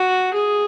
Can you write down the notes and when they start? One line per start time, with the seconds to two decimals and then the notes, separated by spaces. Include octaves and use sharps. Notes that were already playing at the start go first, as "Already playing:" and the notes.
Already playing: F#4
0.34 G#4